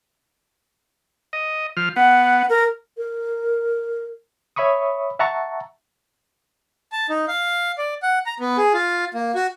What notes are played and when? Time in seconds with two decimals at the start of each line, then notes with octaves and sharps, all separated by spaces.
1.33 D#5
1.77 F3 F6
1.96 B3 F#5
2.49 A#4
2.97 A#4
4.56 C#5 E5 B5 C#6 D#6
5.19 E5 F#5 A5 A#5 C#6
6.92 A5
7.10 D#4
7.28 F5
7.78 D5
8.03 F#5
8.26 A#5
8.40 B3
8.57 G#4
8.74 F4
9.14 A#3
9.35 F#4